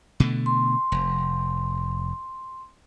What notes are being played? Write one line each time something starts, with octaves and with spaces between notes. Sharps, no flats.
B2 D3 A3
C6
F1